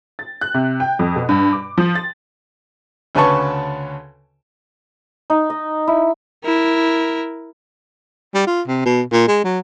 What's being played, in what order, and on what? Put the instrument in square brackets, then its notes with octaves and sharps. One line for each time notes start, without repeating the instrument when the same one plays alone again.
[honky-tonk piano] A6
F#6
C3
G5
F2
B2
G2
D6
F3
A6
[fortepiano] D2 C#3 C#4 B4 A5 C#6
[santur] D#4
D#5
E4
[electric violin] E4 A#4
[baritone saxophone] G3
F4
C3
B2
A#2
G#3
F#3